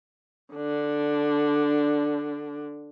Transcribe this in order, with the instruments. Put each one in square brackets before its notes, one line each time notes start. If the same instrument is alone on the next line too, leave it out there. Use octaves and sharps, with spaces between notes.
[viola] D3 D4